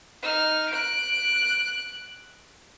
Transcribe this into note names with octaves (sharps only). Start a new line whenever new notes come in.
D#4 F6
F#6 D7